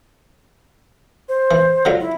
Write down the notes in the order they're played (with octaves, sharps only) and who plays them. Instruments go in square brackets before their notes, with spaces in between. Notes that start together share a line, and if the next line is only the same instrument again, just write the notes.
[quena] C5
[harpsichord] E3
D3 F#3 F4
[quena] E4